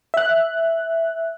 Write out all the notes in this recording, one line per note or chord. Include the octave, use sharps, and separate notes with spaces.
E5 F#6